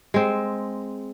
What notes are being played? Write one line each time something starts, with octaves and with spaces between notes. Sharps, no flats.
G#3 C4